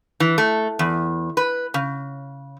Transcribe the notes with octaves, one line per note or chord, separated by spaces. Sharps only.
E3
A3
E2
B4
C#3